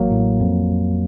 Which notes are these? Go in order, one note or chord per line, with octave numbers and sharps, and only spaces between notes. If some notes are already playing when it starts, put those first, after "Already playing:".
Already playing: A1 F#3 A#3
A2
F2